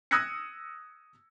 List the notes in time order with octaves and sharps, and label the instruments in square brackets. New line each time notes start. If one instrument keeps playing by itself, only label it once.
[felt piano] D#6 E6 F#6 G#6 A#6 C#7